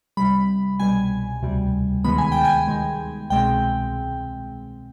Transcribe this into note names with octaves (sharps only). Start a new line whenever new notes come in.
C2 C3 G3 B5
C2 B2 G3 G#5
D2 C3 G3
D#2 D#3 G#3 B3 B5
G#5
G5
G#5
D#2 D#3 G#3
C2 B2 G#3 C4 G5